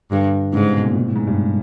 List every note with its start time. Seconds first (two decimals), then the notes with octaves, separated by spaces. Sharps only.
0.11 G2 D3
0.53 G#2 C#3
0.64 C3
0.74 B2
0.84 A#2
0.95 B2
1.06 A2
1.16 G#2
1.27 G2